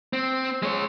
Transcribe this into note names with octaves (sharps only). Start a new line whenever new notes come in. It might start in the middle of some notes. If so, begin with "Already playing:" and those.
C4
G#3 C#5